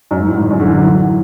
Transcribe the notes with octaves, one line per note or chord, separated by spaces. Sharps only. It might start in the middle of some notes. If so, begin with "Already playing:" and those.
F#2
G#2
A2
G#2
E2
F#2
D3
E3
F#3
E3